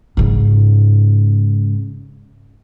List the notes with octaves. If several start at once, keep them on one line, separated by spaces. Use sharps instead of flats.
G#2 C#3